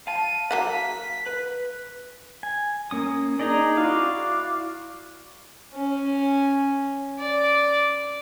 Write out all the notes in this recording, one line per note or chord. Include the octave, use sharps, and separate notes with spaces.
F5 A5 D#7
F#3 A#3 F#5 B6
B4
G#5
A#3 C#4 D#6
D4 D#4 G#4 D5 D#5 A#5
E4 F#4 D5 F5
C#4
D5